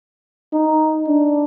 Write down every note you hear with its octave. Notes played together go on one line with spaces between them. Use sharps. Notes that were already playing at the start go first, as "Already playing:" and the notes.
D#4
D4